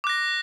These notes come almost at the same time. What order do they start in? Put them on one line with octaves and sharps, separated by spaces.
D6 F#6 A#6